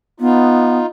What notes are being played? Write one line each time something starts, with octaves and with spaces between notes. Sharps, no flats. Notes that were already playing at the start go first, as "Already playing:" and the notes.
B3 D#4 F4